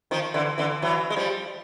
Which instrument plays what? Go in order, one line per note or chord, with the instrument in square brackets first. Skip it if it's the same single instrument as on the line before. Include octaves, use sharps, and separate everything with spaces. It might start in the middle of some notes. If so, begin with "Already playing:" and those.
[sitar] D#3 F3
D3 E3
D3 E3
E3 F#3
G#3
F3 G3